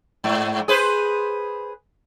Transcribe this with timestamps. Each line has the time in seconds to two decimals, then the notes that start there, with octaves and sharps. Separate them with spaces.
0.24 G#2
0.68 G#4 B4 C5